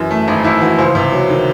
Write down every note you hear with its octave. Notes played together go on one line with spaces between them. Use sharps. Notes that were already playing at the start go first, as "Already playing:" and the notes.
Already playing: F#2 E3
A3
G#1 D#4
G#1 E4
E3 F#4
C#2 C5
C3
F#3
D#3